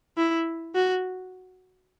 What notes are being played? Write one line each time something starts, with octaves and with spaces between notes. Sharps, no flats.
E4
F#4